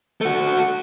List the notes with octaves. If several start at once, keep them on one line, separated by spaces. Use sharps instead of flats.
A3 F#4